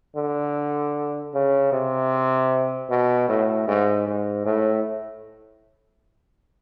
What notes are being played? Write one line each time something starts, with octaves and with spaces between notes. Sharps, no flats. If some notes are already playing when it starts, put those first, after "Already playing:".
D3
C#3
C3
B2
A2
G#2
G#2
A2